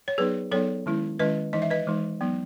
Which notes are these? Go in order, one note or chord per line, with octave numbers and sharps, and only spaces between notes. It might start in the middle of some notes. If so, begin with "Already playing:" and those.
C#5
F#3 B3 D#4 G#4 B4
F#3 B3 D#4 A4 C#5
D#3 G#3 C#4 E4
D#3 G#3 C#4 E4 B4 D#5
E3 G#3 D#4 D#5
E5
B4 D#5
E3 G#3 D#4
F#3 B3 D#4